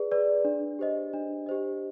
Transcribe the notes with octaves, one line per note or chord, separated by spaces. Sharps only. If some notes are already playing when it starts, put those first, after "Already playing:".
Already playing: G#4 B4 D5
B4 D5
D4
G4 C5 D#5
D4
G4 C5 D#5